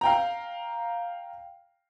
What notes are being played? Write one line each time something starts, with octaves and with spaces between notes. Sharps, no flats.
F5 G5 A#5